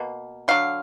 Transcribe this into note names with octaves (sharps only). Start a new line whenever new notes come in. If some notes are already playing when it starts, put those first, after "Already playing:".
Already playing: B2 A#3
D3 F#3 D4 F5